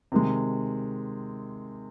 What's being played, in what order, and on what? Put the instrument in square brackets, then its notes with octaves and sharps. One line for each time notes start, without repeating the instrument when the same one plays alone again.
[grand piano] C3 D#3 G#3